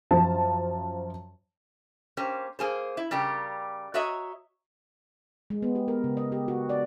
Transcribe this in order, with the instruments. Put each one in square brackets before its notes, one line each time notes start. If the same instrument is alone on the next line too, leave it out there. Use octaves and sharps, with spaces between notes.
[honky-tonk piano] F#2 F3 A5
[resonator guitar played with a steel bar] A#3 C#4 G4 C5
A#3 G#4 C5
E4
C#3 G3 G4 A#4
F#4 C#5 D#5 E5 A#5
[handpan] G#3
B3
G4
A#4
C#3
D#5
G4
F#4
D5